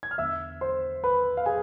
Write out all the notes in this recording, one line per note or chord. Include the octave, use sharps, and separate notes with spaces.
G#6
F6
E2 D3 E5 E6
C5 C6
B4 B5
F5
G#4 G#5